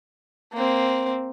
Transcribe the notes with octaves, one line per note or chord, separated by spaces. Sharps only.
A#3 C4